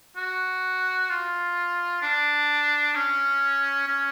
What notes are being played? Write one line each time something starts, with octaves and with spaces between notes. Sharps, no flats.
F#4
F4
D4
C#4
C#4